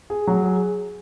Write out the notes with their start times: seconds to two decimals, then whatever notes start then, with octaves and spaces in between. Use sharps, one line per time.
0.10 G#4
0.27 F#3
0.44 G#4